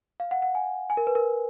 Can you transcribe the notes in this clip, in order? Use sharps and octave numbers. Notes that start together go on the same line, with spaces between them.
F5
F#5
F#5
G#5
G#5
A#4
B4
A#4